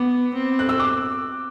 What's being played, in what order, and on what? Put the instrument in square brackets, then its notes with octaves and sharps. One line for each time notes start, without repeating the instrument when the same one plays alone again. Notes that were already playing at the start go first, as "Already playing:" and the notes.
Already playing: [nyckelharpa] B3 [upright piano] D6
[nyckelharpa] C4
[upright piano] F#6
E6
D6